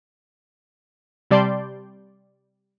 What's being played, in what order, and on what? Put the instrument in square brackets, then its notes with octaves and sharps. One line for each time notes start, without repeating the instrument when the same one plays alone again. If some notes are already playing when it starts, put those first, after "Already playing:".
[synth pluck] C3 G3 D5 A5 C6 G6